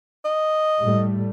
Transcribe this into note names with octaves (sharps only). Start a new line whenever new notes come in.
D#5
A2 G3 A3